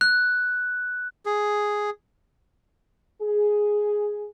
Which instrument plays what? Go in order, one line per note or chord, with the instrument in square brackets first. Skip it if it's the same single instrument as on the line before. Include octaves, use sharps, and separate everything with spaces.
[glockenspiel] F#6
[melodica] G#4
[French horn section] G#4